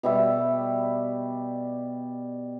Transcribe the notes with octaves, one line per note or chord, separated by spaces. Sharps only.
B2 G3 E5